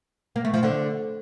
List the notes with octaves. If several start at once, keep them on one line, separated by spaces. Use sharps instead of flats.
A#3
A3
F3
D3